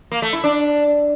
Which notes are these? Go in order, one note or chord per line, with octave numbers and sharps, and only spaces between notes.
A#3
A3
E4
D4